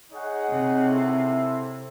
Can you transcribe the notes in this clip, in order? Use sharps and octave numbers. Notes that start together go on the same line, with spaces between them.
D#4 G#4 C#5 F#5
C3
E4 A4 C5 E5